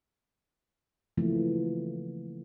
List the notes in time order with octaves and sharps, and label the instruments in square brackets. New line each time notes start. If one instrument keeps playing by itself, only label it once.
[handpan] C#3 E3 F3 A3 A#3 C4